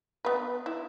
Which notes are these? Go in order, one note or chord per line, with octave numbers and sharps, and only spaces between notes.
B3 B4
E4